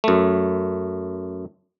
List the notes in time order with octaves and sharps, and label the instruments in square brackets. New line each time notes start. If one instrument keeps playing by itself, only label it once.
[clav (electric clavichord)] F#2 A3